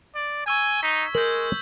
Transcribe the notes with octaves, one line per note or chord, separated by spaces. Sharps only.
D5
G#5 C#6 E6 G#6
D#4 B6
G#3 A#4 G6 F#7